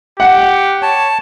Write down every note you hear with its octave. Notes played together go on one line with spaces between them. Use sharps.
G4 F#5
C#5 A5